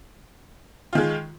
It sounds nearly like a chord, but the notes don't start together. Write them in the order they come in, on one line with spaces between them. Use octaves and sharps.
F4 D#3 G#3